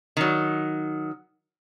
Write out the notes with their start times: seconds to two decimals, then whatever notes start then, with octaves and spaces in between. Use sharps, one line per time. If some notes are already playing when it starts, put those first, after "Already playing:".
0.17 D#3 F#3